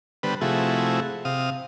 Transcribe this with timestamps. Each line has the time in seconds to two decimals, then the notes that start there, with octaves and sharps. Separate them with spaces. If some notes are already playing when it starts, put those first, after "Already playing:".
0.23 D3 G3 B3 B4 C5
0.41 C3 F3 A3 E4 F#4 G#4
1.25 C3 F5 D#6